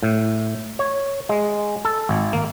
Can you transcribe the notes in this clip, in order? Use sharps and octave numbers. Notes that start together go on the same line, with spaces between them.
A2
C#5
G#3
A4
G#1
A#3